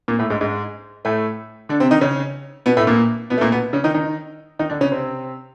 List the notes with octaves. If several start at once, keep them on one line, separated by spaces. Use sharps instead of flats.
A#2 A#3
A2 A3
G#2 G#3
G#2 G#3
A2 A3
D3 D4
C3 C4
D#3 D#4
C#3 C#4
B2 B3
A2 A3
A#2 A#3
B2 B3
A3
A#2 A#3
B2 B3
C#3 C#4
D#3 D#4
D#3 D#4
D#3 D#4
D3 D4
C#3 C#4
C3 C4